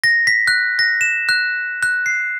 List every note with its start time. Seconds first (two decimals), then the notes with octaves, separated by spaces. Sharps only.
0.04 A#6
0.27 B6
0.48 F#6
0.79 A#6
1.01 E7
1.29 F#6
1.83 F#6
2.06 C7